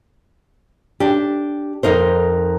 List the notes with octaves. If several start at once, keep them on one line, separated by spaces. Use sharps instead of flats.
D4 G4
F2 D#4 A#4 C5